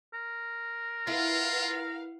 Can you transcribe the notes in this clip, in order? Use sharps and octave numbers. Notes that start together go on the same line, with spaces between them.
A#4
E4 F4 B4 F5 F#5